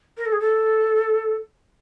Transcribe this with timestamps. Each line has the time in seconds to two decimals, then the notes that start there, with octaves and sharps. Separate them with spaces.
0.17 A#4
0.26 A4
0.32 G#4
0.40 A4